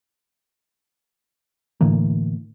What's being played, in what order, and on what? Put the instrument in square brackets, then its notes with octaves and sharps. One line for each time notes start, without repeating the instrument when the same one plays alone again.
[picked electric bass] A2 D3 E3 A#3